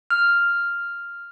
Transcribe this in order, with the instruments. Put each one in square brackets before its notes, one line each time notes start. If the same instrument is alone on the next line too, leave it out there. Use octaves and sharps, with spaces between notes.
[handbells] F6